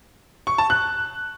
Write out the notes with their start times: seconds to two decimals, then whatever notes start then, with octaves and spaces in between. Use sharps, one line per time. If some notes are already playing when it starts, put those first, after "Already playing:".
0.47 C#6
0.58 A5
0.70 F#6